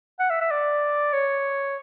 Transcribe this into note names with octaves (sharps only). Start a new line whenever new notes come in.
F#5
E5
E5
D5
C#5